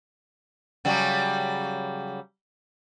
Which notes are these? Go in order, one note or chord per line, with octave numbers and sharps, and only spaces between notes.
C#3 F#3 G3